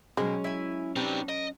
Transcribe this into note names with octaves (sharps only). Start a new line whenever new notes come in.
B2 F#3 G#3 C4 C#4 A#4
E4 G#5
G3 C4 D4 D#4 B4
A#4 D#5